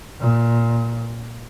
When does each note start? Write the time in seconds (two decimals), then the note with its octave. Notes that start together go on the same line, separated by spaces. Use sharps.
0.20 A#2